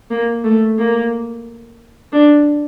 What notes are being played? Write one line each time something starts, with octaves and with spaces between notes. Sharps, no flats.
A#3
A3
A#3
D4